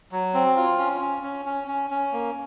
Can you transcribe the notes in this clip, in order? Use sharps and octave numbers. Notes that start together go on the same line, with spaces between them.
F#3
C4
F4
C#4
C#4
C#4
C#4
C#4
C#4
A#3